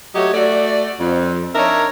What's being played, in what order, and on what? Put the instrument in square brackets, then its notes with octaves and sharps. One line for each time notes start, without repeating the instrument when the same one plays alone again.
[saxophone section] F#3 A3 G4 C#5 D#5
A3 F#4 D5
F2
D4 D#4 A#4 C#5 E5